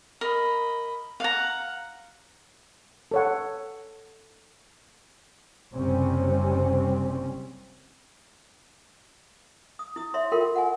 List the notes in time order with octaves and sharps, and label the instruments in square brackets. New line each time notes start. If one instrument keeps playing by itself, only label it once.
[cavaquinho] A#4 [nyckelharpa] D#5 B5
[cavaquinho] F5 A#5 [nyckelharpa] F#5
[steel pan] A4 C#5 F#5
[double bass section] F#1 C3 G3 C4 C#4
[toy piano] D#6
E4 D#6
C#5 E5 C6
F4 A4 A#4 G5 C6
F#5 G#5